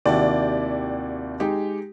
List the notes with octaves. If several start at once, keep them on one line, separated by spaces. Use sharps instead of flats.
D#2 C3 E4 F#4 D5 G5
G#3 D#4 G4